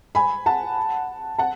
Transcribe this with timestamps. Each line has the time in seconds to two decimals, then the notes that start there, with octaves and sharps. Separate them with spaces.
0.15 G#5 B5
0.46 F#5 A5
1.39 F#5 A5